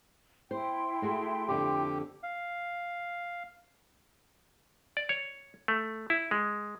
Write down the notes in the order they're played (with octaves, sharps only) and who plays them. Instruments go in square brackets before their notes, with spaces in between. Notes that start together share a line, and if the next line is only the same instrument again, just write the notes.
[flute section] E4 G5 C6 [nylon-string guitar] C5
[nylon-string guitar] A3 F#4 G#4
[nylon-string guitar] F2 D3 [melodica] G4
[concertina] F5
[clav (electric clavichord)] D5
C#5
A3
E4
G#3